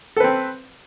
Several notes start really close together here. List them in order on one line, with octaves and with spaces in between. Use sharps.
A4 B4 C4